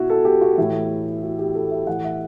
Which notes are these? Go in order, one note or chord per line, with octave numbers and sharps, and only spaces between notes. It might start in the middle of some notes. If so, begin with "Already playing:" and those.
Already playing: B2 E4 F#4
A4
G4
F#4
A2 E3 E4
F#4
G4
A4
E5
A2 E3 F#5
E5